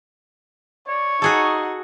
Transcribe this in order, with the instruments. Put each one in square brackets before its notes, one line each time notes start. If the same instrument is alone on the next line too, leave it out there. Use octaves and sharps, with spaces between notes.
[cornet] C#5 [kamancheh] D5
[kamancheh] D#4 F#5 [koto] F#4 G#4 A4